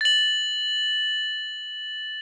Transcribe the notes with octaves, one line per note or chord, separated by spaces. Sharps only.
A6 F#7